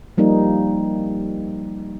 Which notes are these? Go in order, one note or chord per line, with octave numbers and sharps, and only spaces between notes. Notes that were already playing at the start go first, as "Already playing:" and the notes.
F3 G3 A#3 D#4